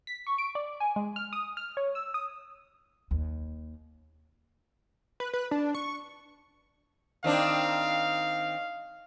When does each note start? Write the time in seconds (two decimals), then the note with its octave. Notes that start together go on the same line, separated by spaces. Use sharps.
0.07 B6
0.27 C#6
0.38 D7
0.55 D5
0.80 G#5
0.96 G#3
1.16 F6
1.33 D#6
1.57 F6
1.77 C#5
1.95 E6
2.14 D#6
3.11 D#2
5.20 B4
5.33 B4
5.51 D4
5.75 C#6
7.24 D#3 C4 D4 F5